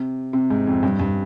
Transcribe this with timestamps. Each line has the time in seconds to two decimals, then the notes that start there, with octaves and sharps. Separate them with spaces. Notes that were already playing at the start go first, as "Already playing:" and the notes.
Already playing: C3
0.33 C3
0.50 G#2
0.67 F2
0.83 G2
1.00 G2